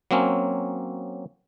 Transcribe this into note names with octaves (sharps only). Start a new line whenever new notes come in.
F#3 A#3 C4 C#4